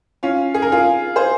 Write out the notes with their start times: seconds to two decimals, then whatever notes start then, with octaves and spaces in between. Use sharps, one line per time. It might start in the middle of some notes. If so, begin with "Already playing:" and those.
0.23 C#4 F4
0.54 G#4
0.62 A#4
0.72 F4 G#4
1.16 G#4 C5